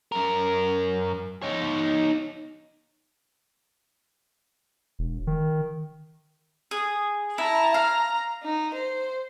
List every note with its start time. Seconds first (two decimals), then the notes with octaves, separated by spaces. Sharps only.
0.12 F#2 A#4
1.42 D#4 C#5
4.99 E1
5.27 D#3
6.71 G#4
7.38 E4 A5 A#5
7.74 F5 A#5
8.44 D#4
8.74 C5